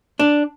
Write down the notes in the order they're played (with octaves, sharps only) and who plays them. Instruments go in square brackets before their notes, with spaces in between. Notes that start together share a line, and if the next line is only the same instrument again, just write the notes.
[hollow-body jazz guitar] D4